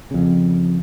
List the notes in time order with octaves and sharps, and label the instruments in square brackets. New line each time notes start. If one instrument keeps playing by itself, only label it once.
[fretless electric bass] F2 C#3